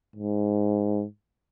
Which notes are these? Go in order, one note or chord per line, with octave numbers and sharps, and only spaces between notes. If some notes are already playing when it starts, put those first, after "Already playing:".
G#2